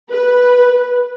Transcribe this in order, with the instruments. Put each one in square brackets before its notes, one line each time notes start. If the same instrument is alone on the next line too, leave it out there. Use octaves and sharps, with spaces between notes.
[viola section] B4